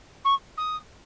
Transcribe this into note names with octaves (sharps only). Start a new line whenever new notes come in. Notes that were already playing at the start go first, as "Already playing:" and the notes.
C#6
D#6